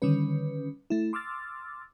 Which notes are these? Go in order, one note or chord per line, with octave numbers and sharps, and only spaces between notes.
D3 D#3 G3 C#4 B4
A3 E4
C6 D6 E6 F6 A6